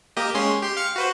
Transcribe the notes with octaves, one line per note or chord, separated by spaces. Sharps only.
A#3 G4 D#5
G#3 C#4 C6
G4 C6
F5 F6 C#7
F#4 B4 C5